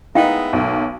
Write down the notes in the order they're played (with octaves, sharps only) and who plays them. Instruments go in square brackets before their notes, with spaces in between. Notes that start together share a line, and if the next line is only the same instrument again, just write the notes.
[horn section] G#3 B3 E5 [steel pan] D#4 E4 [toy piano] F5 G5
[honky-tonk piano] B1 [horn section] F#3 A3 A#3